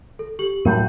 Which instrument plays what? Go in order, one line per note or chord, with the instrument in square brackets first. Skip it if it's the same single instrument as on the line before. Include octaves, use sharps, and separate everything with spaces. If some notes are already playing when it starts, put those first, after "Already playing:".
[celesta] A4
G4 F#7
[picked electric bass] A2 F#3 [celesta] A#4 G5 G6